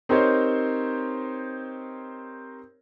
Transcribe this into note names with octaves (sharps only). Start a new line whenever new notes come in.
C4 D#4 G4 A#4 C5 C#5